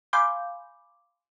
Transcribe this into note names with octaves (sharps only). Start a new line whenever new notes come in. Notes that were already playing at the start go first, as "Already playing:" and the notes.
F5 G#5 B5 C6 D6 G6